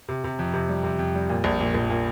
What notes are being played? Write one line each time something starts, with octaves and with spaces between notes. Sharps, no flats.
C3
C3
F2
C3
G3
C3
F2
G3
A#2
A#1
A#2
A#1
A#2